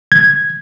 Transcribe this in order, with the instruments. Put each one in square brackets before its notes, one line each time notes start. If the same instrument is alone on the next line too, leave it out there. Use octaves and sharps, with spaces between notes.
[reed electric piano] G#6